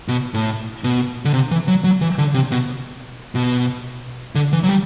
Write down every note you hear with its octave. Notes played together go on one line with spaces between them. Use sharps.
B2
A2
B2
D3
C3
E3
F#3
F#3
E3
D3
C3
B2
B2
D3
E3
F#3
G3